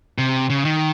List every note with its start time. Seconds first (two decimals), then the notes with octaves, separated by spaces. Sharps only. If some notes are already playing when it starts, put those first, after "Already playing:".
0.18 C3
0.50 C#3
0.65 D#3